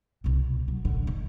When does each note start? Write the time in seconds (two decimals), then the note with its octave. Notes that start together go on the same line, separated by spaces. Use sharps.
0.24 C2 B2
0.68 F#3
0.85 A#1 D3
1.07 G#3